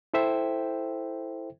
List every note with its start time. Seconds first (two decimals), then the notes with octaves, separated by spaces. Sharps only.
0.14 E4 A4 C5 E5 G5